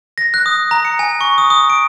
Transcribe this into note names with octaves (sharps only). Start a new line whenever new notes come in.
A#6
F#6
D#6
A#5
C#7
G#5
C#6
D#6
D#6
D7